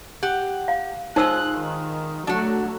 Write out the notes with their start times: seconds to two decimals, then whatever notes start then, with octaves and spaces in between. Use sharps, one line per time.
0.23 G4 F#5
0.68 F5
1.16 G#3 D#4 F4 C5 E6 F#6
1.59 D#3
2.27 F#3 A3 D4 F#4